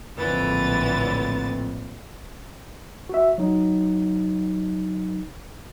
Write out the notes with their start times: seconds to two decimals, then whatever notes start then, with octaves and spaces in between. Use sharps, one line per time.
0.16 A#1 F2 A2 D3 E3 A6
3.09 F#4 E5
3.38 F#3 D#4